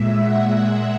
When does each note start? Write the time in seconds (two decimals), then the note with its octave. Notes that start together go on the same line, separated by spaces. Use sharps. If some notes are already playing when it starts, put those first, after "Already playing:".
Already playing: A#2 G#3 E5
0.22 F#5